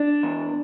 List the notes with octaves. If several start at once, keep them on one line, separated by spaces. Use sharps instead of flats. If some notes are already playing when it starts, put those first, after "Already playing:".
Already playing: D4
E2